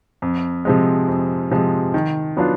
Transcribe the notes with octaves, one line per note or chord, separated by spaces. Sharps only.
F2
C3 F3 G#3
F2
C3 F3 G#3
D#3
F#3 B3 D4 F4